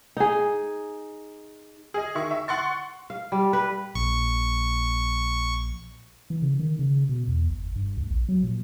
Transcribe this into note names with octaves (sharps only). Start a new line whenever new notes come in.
D#4 G#4
G#4 D#5
D#3 E5 C#6
E5
F#5 C6 C#6 A6
F5
G3
B4
A#1 C#6
E3
C#3
D#3
C#3
B2
E2
G1
G2
D2
A#1
F#3
A#2